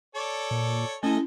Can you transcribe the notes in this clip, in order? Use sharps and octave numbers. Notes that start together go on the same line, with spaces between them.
A4 C#5 D5
A#2
A3 C#4 E4 A4 D#5 G#5